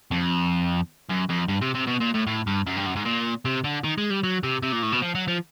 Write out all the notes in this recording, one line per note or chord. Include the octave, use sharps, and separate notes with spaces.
F2
F#2
F2
G2
C3
C3
B2
A#2
A2
A2
G2
F#2
G2
F#2
G#2
A#2
C3
D3
D#3
G#3
G3
F#3
C3
C3
A#2
A2
B2
F3
F#3
F3